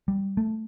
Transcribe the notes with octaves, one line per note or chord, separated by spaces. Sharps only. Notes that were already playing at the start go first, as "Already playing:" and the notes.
G3
A3